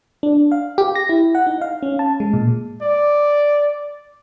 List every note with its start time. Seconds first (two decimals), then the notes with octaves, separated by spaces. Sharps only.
0.23 D4
0.52 F5
0.78 G4
0.95 A#6
1.09 E4
1.35 F#5
1.47 D#4
1.62 F5
1.83 C#4
1.99 A5
2.20 G#3
2.33 A#2
2.82 D5